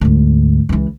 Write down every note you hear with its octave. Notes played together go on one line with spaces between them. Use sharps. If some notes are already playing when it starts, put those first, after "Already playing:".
D2 G#2
C#2 E3